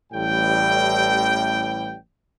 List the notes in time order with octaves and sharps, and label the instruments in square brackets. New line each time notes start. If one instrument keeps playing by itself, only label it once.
[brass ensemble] A1 A2 G3 G5